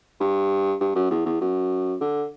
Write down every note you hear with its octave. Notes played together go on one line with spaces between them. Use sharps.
G2
G2
F#2
E2
E2
F#2
D3